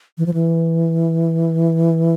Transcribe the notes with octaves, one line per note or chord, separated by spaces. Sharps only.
E3
F3
E3